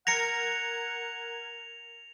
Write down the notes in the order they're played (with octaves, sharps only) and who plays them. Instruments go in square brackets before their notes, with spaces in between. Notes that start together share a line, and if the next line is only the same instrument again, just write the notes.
[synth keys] A#4 G#6 [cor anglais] F#5 [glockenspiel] A#6 C#7 [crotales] F7